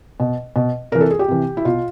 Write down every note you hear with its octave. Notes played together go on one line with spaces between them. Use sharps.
B2
B2
C3 E3 A#4
A4
G#4
G4
C3 E3
E4
B2 F4